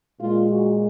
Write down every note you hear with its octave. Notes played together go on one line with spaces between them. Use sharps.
A#2 G#3 F4
F#4